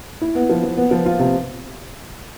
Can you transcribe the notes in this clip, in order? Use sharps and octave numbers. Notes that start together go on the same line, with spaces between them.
E4
B3
F3
F3
B3
F3
F4
C3